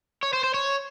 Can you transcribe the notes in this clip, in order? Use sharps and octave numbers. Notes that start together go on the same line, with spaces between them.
C#5
C5
C5
C#5